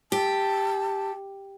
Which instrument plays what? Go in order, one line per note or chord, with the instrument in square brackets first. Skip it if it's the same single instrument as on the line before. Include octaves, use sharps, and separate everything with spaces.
[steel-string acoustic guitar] G4 [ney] A5